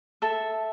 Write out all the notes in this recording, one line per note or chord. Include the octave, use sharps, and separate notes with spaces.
A4 E5